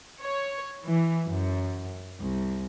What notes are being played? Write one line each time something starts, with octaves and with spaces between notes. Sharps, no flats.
C#5
E3
F#2
C2